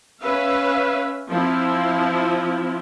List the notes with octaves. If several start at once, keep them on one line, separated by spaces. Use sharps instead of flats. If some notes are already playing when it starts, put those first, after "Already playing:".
C#4 B4 E5 F5
F3 C4 E4